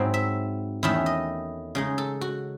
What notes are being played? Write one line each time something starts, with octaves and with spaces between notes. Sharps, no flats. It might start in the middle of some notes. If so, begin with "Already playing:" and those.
Already playing: G#2 F#3 C4 E4
E5
E2 D#3 A3 C#4 E4 E5
D#5
C#3 G#3 D#4
A4
F#4